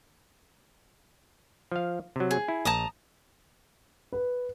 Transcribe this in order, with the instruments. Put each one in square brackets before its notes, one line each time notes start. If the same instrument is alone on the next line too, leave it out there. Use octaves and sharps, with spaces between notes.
[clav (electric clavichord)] F3 F5
C3 F#3
[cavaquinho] G#4
[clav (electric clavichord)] E4
[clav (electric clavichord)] A#1 [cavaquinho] A5 A#5 D#6
[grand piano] B4